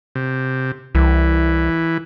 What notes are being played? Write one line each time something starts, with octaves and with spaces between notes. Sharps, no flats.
C3
C2 E3